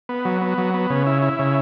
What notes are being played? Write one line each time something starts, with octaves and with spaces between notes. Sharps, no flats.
B3
F#3
B3
F#3
B3
C#3
E4
E4
C#3